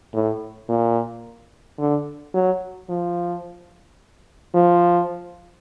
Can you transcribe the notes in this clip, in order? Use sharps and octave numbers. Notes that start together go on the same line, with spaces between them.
A2
A#2
D3
F#3
F3
F3